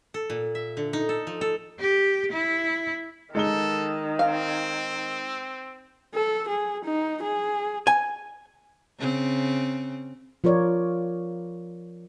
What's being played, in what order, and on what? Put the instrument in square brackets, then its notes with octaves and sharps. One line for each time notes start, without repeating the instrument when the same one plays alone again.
[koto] A4
A#2
E5
D3
D#4
A4
F3
A4
[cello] G4
E4
[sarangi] D#3 [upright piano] G#3 D#4 G7 [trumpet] A4
[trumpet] C4 [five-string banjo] F5
[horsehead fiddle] A4
G#4
D#4
G#4
[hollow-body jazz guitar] G#5
[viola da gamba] C#3 C4
[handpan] F3 F4 A#4 C#5 D5